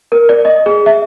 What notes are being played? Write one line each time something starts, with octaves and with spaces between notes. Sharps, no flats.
A#4
D5
D#5
G#4
E5